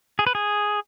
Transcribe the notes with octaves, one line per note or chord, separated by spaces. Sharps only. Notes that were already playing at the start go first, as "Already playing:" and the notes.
G#4
B4
G#4